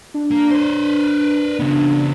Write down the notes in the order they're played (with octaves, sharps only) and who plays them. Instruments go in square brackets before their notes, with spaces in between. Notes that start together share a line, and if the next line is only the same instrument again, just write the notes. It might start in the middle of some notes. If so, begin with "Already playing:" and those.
[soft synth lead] D4
[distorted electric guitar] A#3
B4 C5
C#3 B3